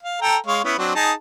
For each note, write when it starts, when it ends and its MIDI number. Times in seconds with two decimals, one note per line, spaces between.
0.03 0.18 77
0.22 0.37 69
0.22 0.37 79
0.22 0.37 82
0.46 0.62 56
0.46 0.62 73
0.46 0.62 77
0.64 0.75 59
0.64 0.75 61
0.64 0.75 64
0.78 0.91 54
0.78 0.91 60
0.78 0.91 62
0.95 1.12 63
0.95 1.12 68
0.95 1.12 81